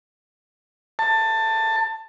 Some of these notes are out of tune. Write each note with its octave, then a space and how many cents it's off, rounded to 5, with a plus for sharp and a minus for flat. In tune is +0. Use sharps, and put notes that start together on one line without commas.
A5 +15